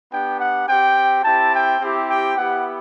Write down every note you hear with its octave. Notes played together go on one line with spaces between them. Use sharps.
B3 D4 G4 G5
F#5
C4 G4 G5
C4 E4 G4 A5
G5
C4 E4 G4
G5
B3 E4 G4 F#5